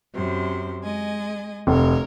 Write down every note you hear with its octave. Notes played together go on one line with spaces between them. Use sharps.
F#2 C3 C5
G#3 D#5 G#5
F1 D2 A#4 C#5